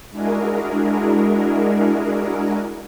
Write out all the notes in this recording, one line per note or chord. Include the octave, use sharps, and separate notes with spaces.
G#3 D4 E4 F#4 G#4 A#4